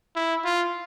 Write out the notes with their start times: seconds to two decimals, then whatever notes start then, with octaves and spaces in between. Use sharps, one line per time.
0.16 E4
0.45 F4